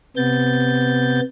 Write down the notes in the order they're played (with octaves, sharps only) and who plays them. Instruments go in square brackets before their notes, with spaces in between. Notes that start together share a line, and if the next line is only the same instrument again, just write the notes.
[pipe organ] C3 B3 G6 A6